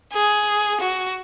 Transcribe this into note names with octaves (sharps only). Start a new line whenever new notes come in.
G#4
F#4